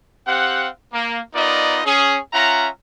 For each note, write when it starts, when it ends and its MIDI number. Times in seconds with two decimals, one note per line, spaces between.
0.27 0.68 60
0.27 0.68 67
0.27 0.68 77
0.27 0.68 78
0.93 1.20 58
1.34 1.80 59
1.34 1.80 63
1.34 1.80 65
1.34 1.80 70
1.34 1.80 74
1.34 1.80 75
1.85 2.18 61
1.85 2.18 68
2.33 2.68 61
2.33 2.68 65
2.33 2.68 76
2.33 2.68 78
2.33 2.68 82